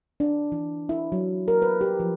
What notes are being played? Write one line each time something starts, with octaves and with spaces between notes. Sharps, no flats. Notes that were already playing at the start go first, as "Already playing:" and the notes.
D4
E3
E4
F#3
A#4
B4
G4
F3